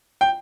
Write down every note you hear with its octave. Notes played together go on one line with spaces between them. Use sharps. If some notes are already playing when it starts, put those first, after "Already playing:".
G5